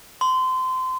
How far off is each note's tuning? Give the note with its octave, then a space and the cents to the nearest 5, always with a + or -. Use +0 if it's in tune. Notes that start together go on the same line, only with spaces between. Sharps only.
C6 -25